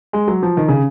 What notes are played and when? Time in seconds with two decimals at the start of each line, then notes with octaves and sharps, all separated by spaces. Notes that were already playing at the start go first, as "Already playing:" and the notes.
0.13 G#3
0.28 F#3
0.42 F3
0.57 D#3
0.68 C#3